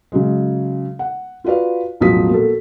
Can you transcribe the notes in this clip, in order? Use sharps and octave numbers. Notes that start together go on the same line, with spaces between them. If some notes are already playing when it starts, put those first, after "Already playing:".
C#3 F#3 G#3
F#5
F4 F#4 B4 D5 F5
E1 A1 F3 F#3 D#6 B6
A#2 F#4 A4